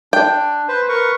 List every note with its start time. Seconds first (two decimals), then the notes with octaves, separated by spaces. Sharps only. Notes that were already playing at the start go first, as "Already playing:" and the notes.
0.13 D4 G5
0.68 B4 C5
0.89 A#4 B4 C#6